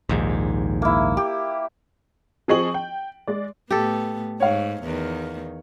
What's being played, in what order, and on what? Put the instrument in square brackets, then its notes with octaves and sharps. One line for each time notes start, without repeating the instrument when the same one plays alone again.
[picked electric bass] A#1 D#2 G#2
[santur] A#3 E4
G4
[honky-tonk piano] F3 C4 G#4 D#5 C#6 F#7
G5
G#3 D5
[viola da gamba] A2 B3 [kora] G4 A4
[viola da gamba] G#2 [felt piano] C#5 F5
[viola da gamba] E2 D#3